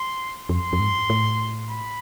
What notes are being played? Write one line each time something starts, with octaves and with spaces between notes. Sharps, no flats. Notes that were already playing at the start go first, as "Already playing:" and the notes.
Already playing: C6
F2 C6
F2
G#2
A2
B5